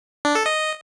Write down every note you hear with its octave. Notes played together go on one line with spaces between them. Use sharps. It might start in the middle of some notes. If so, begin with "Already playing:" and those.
D4
A4
D#5